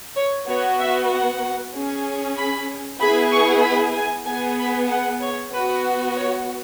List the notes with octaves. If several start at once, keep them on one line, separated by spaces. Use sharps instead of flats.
C#5
B3 F#4 C#5
E5
F#5
C#4 G#4
B5
B3 E4 G#4 B5
C#6
B5
G#5
B3 G#4 G#5
B5
F#5
C#5
B3 F#4 B4
C#5